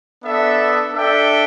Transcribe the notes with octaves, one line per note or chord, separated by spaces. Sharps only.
B3 D4 A4 E5
D4 A4 E5 G5